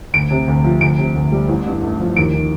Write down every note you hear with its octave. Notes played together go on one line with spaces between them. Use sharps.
D2 D7
C3
D2
F3
D2 D7
C3
D2
G3
A1
G2
A3
F3
D#2 D7
D#3